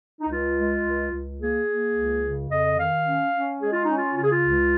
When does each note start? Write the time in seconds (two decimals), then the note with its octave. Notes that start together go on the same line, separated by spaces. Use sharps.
0.21 D#4
0.29 C#2 F4
0.57 G#3
0.84 C#2
1.12 C#2
1.39 A#3 G#4
1.67 A#3
1.94 C#2
2.22 C#3
2.49 F2 D#5
2.77 D#3 F5
3.05 C#4
3.32 C#4
3.60 G#3 G#4
3.72 F4
3.84 C#4 D#4
3.96 F4
4.15 C#3 F4
4.23 G#4
4.31 F4
4.42 C#2